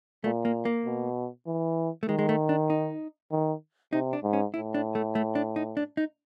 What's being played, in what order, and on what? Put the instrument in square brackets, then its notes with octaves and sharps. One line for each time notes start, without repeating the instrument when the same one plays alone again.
[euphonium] A#2 [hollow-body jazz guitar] A3
[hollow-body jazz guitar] A#3
A#3
[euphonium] B2
E3
[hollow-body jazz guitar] A3
[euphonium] D#3 [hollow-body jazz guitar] G#3
[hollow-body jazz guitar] G#3
A3
D4
D#4
[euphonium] D#3
[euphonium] C3 [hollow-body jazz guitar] D#4
[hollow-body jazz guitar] D4
[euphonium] G#2
[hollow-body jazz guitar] C#4
[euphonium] A2 [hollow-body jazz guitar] E4
[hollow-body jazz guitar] D4
A3
A3
D4
D#4
D4
D#4